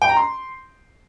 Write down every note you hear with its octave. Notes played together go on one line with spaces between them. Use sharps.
G5
A#5
C6